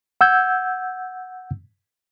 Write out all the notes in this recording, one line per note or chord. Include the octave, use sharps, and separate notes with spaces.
F#5 E6 G6 G#6